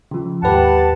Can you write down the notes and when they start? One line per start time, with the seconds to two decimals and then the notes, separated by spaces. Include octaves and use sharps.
0.11 C#3 F3
0.43 D#2 G#2 G4 B4 F#5 A5